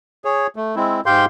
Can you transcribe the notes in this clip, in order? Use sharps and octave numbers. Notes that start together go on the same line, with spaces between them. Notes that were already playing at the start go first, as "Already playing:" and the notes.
G#4 C#5
A3
G#3 C4 E4
G#2 G4 F5 G5 C6 G6